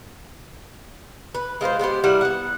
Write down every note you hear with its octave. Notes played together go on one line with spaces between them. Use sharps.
B4
G#3 F4 B4 C5
G#3 B3 G4 C5
G3 E4 A#4 F#5
B3 F#5